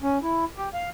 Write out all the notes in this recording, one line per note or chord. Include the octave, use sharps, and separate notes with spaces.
C#4
E4
G4
F5